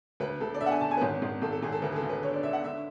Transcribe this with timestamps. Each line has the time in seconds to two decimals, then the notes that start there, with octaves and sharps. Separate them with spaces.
0.20 D2 B4
0.40 D2 A4
0.54 D5
0.61 D3 E5
0.66 F#5
0.71 G#5
0.81 D3 A5
0.91 G#5
0.97 B4
1.02 G#1 C#5
1.22 G#1
1.42 G#1 A4
1.52 A4
1.62 G#1 G#4
1.72 A4
1.82 D2 B4
1.92 G#4
1.96 A4
2.02 D2
2.10 B4
2.23 D3 C#5
2.33 D5
2.43 D3 E5
2.53 F#5
2.64 D3 E5